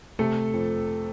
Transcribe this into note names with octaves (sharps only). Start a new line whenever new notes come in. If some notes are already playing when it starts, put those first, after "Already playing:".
C3 A3 A4
F2